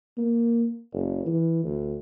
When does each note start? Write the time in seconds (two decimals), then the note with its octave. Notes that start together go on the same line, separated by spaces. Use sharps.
0.17 A#3
0.92 F#1
1.26 E3
1.63 D2